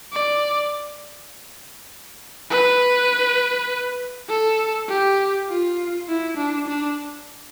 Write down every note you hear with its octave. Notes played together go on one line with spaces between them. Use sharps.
D5
B4
A4
G4
F4
E4
D4
D4